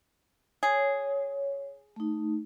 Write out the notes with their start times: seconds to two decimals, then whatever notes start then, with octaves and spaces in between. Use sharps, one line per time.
0.63 G#4 C#5
1.96 A3 D#4